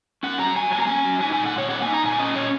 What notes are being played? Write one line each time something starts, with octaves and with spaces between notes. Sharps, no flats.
C#4 F#5
F#3 A#5
F#3 G#5
A#3 G#5
A#5
C#4 G#5
F#3
D#4 G#5
A#2 G#5
F#5
A#2 C#5
A#3 F#5
D#4 G#5
A#5
A#2 G#5
C#4 D#5
A#2 C#5